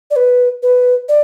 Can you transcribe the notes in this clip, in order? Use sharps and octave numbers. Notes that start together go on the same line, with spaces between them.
D5
B4
B4
D5